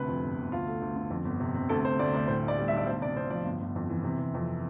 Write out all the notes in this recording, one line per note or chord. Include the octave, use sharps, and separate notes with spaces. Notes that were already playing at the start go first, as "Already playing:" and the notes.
Already playing: D2 C3 B4
F2
G1
G1
D2 F4
A3
D2
D3
F2
G1
C3
C3
D2 A4
D2 C5
D2 D5
D2 D5
A2 C5
B1
D5
G3
E5
B1 D5
D2 C5
C3 D5
C3 C5
F3 D5
G1
G1
F2
E3
C3
C3
F2